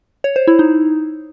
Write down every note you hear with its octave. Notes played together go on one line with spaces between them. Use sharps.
C#5
C5
E4
D#4